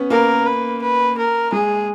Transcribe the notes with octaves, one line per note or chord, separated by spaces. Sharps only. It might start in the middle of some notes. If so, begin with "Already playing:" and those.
Already playing: B3 C#4
A#3 A#4
B4
B4
A#4
G#3 G#4